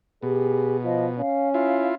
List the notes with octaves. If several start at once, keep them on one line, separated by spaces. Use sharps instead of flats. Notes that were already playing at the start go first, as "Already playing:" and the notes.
B2 G4 G#4
F3 D#5
C#4 F5
E4 F4 F5